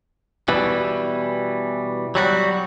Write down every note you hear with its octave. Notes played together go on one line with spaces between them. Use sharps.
B2 E3 G3
F#3 G3 F#4